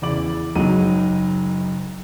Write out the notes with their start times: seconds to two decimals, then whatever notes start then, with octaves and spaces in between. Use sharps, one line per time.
0.02 E2 C#3 E4 D5 D6 F#7
0.55 F#1 F#3 G#3 D#4 D#7